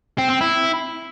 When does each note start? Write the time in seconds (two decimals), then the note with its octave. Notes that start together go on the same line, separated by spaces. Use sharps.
0.18 C4
0.30 C4
0.41 E4